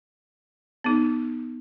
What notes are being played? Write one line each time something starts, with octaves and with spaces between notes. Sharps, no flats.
B3 D#4